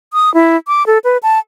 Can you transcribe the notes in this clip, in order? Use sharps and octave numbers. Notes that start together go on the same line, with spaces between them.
D#6
E4
D6
A4
B4
A5